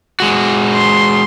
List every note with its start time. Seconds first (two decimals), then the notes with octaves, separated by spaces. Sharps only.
0.20 G#3 F#4
0.74 C6